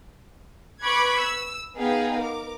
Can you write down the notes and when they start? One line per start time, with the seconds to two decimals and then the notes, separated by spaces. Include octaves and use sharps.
0.83 B4 B5 C#6 D6 F#6 G#6
1.19 E6
1.76 B3 D#4 G#4 F5 G5
2.18 A#4 D6